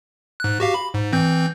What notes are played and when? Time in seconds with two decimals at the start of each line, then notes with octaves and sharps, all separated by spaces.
0.40 G#2 F#6
0.60 F#4 G4 F5
0.74 B5
0.94 G#2
1.12 E3 C4 G6